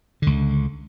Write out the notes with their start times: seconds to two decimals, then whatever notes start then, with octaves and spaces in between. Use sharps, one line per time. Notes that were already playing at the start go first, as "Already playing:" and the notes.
0.22 C#2 D3